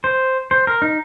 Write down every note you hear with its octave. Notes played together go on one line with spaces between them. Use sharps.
C5
C5
A#4
D#4